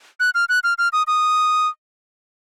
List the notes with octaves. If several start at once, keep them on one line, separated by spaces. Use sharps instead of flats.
F#6
F6
F#6
F6
F6
D#6
D#6